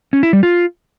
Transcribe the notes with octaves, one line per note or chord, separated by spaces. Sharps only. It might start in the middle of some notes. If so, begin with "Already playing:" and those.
C#4
E4
G3
F4